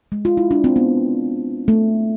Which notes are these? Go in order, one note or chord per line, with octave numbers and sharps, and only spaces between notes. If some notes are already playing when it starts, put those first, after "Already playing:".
G#3
F4
E4
D4
C4
B3
A3